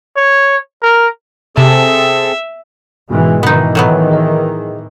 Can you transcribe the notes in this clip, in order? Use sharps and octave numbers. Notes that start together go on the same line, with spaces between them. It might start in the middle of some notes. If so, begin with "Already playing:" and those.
C#5
A#4
C3 C4 G#4 A4 E5 A5
G#2 B2 E3 G#3
D#3 E3 B3 D#4
A2 F#3 B3
G#4 A#4 D#5